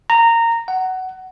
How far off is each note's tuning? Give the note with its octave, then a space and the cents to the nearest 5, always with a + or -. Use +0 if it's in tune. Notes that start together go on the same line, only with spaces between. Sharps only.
A#5 -15
F#5 +15